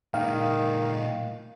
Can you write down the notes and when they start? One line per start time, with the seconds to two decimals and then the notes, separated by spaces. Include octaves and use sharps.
0.14 A#2 D#3 G#3 F5